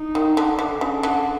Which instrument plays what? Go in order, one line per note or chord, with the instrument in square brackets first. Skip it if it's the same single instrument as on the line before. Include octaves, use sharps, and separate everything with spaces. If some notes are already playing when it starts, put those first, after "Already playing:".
Already playing: [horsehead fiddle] D#4
[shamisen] D#3
D3
D3
[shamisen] C#3 [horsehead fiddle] D4
[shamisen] D3